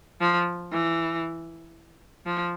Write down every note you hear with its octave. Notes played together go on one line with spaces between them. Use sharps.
F3
E3
F3